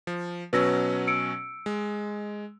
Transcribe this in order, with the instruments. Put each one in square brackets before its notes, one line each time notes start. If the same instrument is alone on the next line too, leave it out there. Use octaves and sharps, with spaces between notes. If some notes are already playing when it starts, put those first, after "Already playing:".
[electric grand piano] F3
[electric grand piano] B2 F#3 C#4 [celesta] B4 E6 A#6
[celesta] E6 C#7 D7
[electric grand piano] G#3